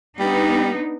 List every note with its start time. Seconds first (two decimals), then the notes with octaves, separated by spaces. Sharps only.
0.19 G3 B3 D4 D#4